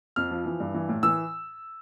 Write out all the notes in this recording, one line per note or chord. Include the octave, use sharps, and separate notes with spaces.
F2 F6
F3
E3
G2
E3
A2
E3 E6